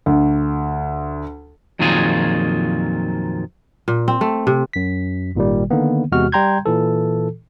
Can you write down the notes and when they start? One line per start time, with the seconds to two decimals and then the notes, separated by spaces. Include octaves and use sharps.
0.06 D2
1.79 F2 A#2 D#3 F#3 F4 G#4
3.88 A#2
4.08 C4
4.21 A3
4.47 C3
4.73 F#2 B6
5.35 G#1 A#2 D#3 G3
5.71 D3 D#3 A#3 B3
6.12 E2 C3 G#3 F#4 F6
6.32 G3 G5 A#5 C6 G6 G#6
6.66 A#2 E3 A4